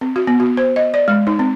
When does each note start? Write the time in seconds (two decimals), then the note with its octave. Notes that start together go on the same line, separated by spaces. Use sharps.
0.01 C4
0.16 F#4
0.27 B3
0.40 F#4
0.57 C5
0.76 D#5
0.94 D5
1.08 G#3
1.27 D#4
1.39 C4